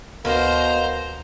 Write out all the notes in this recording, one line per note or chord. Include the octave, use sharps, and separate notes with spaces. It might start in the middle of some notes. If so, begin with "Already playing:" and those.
D2 B2 A#3 B3 A#4 C5 A#5